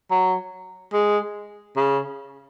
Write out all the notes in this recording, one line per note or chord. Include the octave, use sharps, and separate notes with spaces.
F#3
G#3
C#3